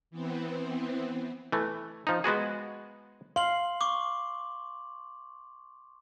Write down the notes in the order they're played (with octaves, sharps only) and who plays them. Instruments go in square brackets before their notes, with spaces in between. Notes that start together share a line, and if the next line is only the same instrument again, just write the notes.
[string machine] E3 B3 C4
[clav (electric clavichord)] E3 A3
F3 D#4
G#3 B3 F#4 G#4
[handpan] F5 [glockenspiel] C6 F#7
[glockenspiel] C#6 D6